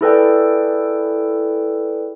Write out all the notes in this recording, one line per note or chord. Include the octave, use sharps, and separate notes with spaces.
E4 G#4 A4 B4 D5 G5